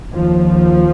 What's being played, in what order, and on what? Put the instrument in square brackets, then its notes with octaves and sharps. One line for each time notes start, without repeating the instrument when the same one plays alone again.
[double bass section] D#2 F3